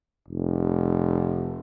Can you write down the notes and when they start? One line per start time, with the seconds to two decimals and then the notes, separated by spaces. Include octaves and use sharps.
0.28 F1